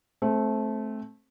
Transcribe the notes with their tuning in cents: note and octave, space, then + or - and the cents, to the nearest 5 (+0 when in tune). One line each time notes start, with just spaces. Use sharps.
A3 -15 C4 +10